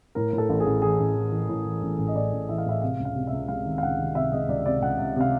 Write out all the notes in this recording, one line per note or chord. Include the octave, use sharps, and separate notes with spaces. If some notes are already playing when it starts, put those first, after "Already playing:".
A2 A#4
A2
A4
A1
G#4
A1
E3 G#4
A1
E3
E3
A2
E3
A1
A1
D#5
A2 D5
A1
E3 E5
F5
A2 E5
C3 F5
C#2
F5
C3
E5
C#2
G#3 F5
D#3
F5
C#2 F#5
D#3
C3 E5
G#3 D#5
C#2 D5
C3 D5
C#2 F#5
C#2
C3 F5